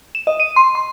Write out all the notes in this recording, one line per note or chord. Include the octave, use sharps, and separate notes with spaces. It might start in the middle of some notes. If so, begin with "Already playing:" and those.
E7
D#5
D#7
C6
C6